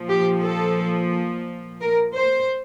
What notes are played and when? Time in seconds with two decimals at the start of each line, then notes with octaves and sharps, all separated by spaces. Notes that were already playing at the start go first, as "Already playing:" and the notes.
Already playing: A#2 F3
0.09 G4
0.43 A4
1.81 A#4
2.15 C5